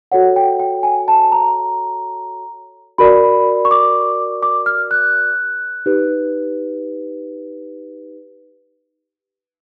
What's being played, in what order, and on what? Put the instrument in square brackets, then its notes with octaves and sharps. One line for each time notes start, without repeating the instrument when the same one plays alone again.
[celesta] F#4 A4 C#5 F#5
G5
G5
G#5
A5
A#5
F#4 A#4 D5 B5
C#6
D6
D6
F6
F#6
D#4 G4 B4